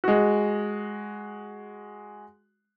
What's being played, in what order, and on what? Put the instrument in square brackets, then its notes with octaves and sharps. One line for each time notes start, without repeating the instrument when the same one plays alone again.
[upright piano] G#3 F#4